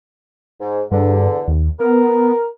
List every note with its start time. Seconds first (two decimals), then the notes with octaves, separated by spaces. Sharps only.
0.61 G#2
0.92 E2 G2 D3
1.48 D#2
1.80 B3 A#4